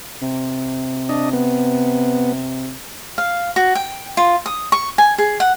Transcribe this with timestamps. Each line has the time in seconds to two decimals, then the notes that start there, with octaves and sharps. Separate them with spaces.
0.22 C3
1.09 D4 D#5
1.33 B3
3.18 F5
3.56 F#4
3.75 G5
4.17 F4
4.46 D#6
4.72 C#6
4.98 G#5
5.18 G#4
5.40 F#5